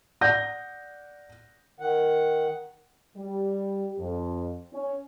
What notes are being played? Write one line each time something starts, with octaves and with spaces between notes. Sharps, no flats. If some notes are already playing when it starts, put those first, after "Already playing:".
D5 F#5 G6 A#6
D#3 F#5
G3
F2
C#4